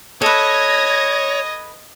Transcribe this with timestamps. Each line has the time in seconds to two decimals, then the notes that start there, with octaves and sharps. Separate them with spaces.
0.22 A4 B4 C#5 D#5 G#6 A#6